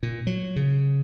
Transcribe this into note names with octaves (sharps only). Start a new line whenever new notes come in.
A#2
F#3
C#3